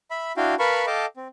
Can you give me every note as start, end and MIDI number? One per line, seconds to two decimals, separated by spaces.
0.11 0.32 76
0.11 0.32 83
0.37 0.55 62
0.37 0.55 64
0.37 0.55 66
0.37 0.55 77
0.37 0.55 79
0.59 0.86 70
0.59 0.86 71
0.59 0.86 77
0.59 0.86 81
0.59 0.86 83
0.59 0.86 85
0.87 1.06 69
0.87 1.06 75
0.87 1.06 77
0.87 1.06 79
0.87 1.06 81
0.87 1.06 86
1.17 1.28 60